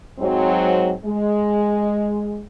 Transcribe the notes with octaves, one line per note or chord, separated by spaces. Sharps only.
G#2 F#3 C4
G#3